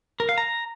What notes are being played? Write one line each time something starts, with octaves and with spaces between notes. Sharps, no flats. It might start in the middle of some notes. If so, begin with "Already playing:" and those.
A#4
F5
A#5